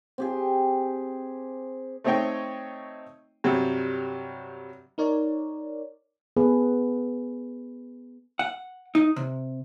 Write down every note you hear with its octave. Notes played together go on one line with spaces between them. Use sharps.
C4 G4 G#4
A3 C4 D#4 C#5 D#5 G5
G2 C3 F#3 G3
D#4 A#4 C#5 D5
B3 G#4 A4 B4
F#5
D#4
C3